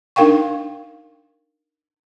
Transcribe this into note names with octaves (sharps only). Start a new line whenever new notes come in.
D4 D#4 A#4 F5 G5 C#6